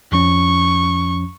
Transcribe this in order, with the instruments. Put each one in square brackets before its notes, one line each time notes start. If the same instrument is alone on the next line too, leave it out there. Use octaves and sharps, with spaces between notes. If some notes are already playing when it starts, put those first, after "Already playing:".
[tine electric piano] F2 F3 C#4 [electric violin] C#6